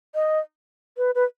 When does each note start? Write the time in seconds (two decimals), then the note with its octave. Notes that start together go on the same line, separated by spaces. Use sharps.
0.15 D#5
0.97 B4
1.15 B4